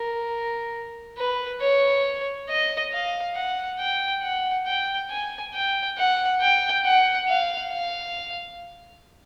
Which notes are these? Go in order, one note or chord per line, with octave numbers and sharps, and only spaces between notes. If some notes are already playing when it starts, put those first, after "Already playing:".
Already playing: A#4
B4
C#5
D#5
F5
F#5
G5
F#5
G5
G#5
G5
F#5
G5
F#5
F5
F5